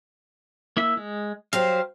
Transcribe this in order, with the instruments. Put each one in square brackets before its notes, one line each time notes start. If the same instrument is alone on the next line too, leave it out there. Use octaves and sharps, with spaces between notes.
[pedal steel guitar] A#3 E4 E5
G#3
[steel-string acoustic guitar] F#3 G4 C5 [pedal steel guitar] F5